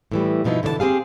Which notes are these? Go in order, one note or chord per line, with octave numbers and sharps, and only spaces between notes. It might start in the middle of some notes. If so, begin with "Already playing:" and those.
A2 E3 G3
G2 B2 F3 D#4 E4
B2 D3 E3 C#5 A5
C4 G4 G#4 F5